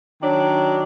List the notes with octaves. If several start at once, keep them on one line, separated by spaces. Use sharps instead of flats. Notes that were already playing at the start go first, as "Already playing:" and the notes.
D#3 F#3 D4